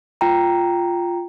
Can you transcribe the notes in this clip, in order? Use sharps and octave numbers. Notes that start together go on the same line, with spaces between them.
F4 G5 A#5